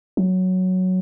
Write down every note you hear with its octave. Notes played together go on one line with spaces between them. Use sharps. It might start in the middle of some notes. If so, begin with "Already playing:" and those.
F#3